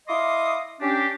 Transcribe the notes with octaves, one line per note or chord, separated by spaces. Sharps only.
E4 D#5 F5 C6 D6 D#6
C#4 D4 G4